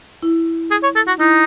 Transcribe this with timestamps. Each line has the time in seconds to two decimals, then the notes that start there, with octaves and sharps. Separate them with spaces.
0.23 E4
0.71 G#4
0.83 C#5
0.96 A4
1.07 F#4
1.19 D#4 E4